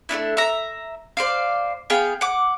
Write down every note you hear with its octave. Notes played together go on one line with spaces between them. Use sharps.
A3 B3 D4 E4
E5 A#5
C5 D5 F5
B3 G#4 F5 G5
F#5 D6